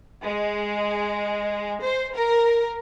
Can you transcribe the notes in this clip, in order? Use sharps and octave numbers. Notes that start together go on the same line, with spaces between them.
G#3
C5
A#4